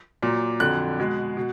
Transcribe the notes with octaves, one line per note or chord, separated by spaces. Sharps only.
A#2 F#3
F2 D3 F#3 F#6
B2 G#3
B2